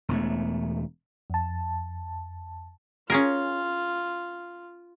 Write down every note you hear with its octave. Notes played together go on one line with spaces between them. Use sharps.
E1 E2 A3
F2 A5
C#4 F4 G#4 A#4